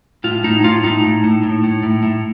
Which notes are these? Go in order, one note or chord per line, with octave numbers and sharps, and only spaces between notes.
A2 F4
A2 D#4
A2 F4
A2 D#4
A2
A2
A2
A2
A2
A2